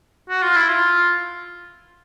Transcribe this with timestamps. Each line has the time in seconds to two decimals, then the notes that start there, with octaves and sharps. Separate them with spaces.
0.30 F#4
0.43 F4
0.56 E4
0.69 F4